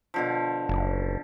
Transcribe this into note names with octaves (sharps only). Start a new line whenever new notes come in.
B2 D3 F3
F#1